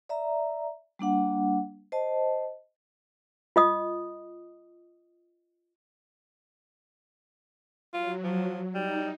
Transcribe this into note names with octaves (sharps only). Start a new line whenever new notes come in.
D5 E5 A#5
G3 A#3 D4 F#5
C5 D#5 A5
F4 D#5 D#6
F#3 F4
F3
G3 D#4